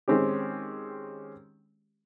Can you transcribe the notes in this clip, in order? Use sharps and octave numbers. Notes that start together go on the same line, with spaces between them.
D#3 G#3 C4 C#4 G4